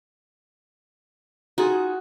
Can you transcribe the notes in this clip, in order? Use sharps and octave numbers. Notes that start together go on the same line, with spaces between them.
D#4 F4 F#4 G#4